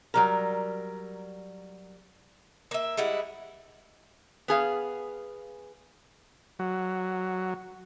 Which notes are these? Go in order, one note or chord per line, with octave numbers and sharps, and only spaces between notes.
F#3 G3 A#4
A#3 E5
G3 G#3 E4 F#5
B3 G#4 F5
F#3